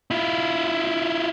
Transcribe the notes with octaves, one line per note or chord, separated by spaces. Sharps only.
E4 F4